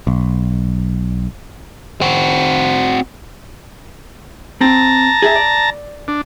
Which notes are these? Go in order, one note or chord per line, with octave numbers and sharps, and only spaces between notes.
B1
C4 F#4
C4 A5 A#5
G#4 E5
D5
D4